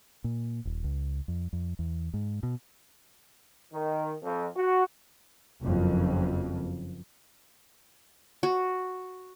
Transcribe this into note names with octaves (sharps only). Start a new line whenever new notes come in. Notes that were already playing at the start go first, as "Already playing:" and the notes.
A#2
D#1
C#2
F2
F2
E2
G#2
B2
D#3
F2
F#4
F#1 F2
F#4